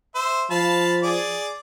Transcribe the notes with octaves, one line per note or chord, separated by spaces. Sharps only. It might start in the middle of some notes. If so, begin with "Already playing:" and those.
C5 E5
F3 F5 A5 B5
G#4 D5